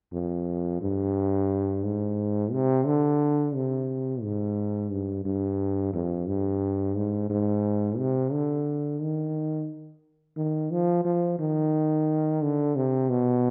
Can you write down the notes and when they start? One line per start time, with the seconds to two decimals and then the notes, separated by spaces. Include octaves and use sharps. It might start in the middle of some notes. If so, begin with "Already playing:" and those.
0.13 F2
0.82 G2
1.84 G#2
2.52 C3
2.86 D3
3.55 C3
4.22 G#2
4.91 G2
5.25 G2
5.93 F2
6.27 G2
6.96 G#2
7.30 G#2
7.98 C3
8.32 D3
9.00 D#3
10.37 D#3
10.71 F3
11.05 F3
11.39 D#3
12.42 D3
12.76 C3
13.10 B2